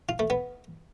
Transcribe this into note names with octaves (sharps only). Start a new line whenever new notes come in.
F4
A3
B3